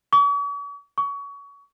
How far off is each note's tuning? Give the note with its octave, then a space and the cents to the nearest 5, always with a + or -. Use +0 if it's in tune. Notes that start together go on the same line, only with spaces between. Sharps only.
C#6 +45
C#6 +25